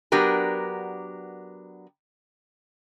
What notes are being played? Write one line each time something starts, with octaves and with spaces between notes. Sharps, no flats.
F#3 B3 D4 G4 A#4